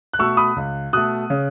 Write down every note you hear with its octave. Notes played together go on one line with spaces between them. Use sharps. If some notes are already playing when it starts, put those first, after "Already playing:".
F#6
B2 A3 C#6 E6
B5 D#6
C#2
B2 A3 D#6 F#6
C#3